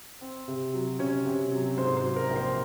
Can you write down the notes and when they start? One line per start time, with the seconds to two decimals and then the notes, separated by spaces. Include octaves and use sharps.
0.21 C4
0.48 C3
0.74 F#3
0.99 C3 C#4 C#5
1.26 C3
1.51 F#3
1.78 G#2 C5
1.97 C5
2.03 F#3
2.16 A#4
2.29 A#1
2.36 C5